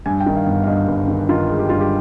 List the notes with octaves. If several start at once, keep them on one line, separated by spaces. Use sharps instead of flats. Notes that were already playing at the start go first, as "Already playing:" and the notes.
G2 G#5
G5
D#3
F5
G1
F5
F5
G2 D#5
G1
D#3
D#3 F4
G#3
G4
G2 F4
G4